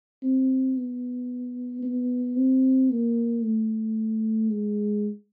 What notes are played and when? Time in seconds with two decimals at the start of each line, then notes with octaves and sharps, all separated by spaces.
0.23 C4
0.77 B3
1.83 B3
2.36 C4
2.90 A#3
3.43 A3
4.50 G#3